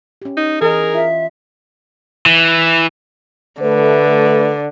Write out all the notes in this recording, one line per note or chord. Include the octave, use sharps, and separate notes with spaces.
C#4 G4
D#4
E3 D#4 G#4 A#4 D#5
F4 E5
E3
D3 A3 B4